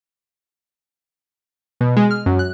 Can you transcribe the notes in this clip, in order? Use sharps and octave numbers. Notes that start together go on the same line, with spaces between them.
B2
G#3
F6
F#2
F#6